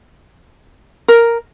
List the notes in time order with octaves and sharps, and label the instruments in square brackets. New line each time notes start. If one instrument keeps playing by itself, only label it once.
[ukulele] A#4